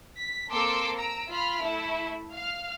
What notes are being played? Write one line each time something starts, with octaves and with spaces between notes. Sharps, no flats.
B6
A#3 C4 A4 C6 D6 E6
A#5 E6 D7
F4 B5 F6
A3 E4
F5 F6